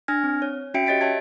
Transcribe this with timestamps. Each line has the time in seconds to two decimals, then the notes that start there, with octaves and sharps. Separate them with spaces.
0.08 D4 G#5 F6 G#6 A#6
0.24 C4
0.42 C#5
0.74 C#4 F#4 E5 G5 C#7 D7
0.87 G4 C#5 D#5 A6 B6 D7
1.01 C#5 E5 A5 G#6